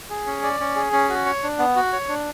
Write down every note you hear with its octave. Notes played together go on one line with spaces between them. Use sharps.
G#4
C#4
D5
C#4
G#4
C#4
F#4
C#5
D4
B3
F#4
C#5
D4